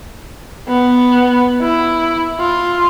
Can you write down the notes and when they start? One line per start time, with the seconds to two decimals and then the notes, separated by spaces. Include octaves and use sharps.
0.68 B3
1.62 E4
2.40 F4